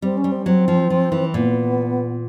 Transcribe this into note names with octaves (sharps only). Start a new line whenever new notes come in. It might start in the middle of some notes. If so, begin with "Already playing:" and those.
G3 C4
C#4
G3
C4
F#3 C4
F3
F3
E3
A#2 B3